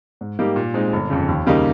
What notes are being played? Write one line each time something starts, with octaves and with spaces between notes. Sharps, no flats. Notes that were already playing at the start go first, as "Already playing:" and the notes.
G#2
G3 A#3 D#4 G4
A#2
G#3 C4 D#4
G1
F2 C#3
D#2
C#3 G3 A#3 D#4